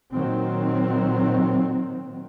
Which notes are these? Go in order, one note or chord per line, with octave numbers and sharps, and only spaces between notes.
A#2 D#3 F#3 C4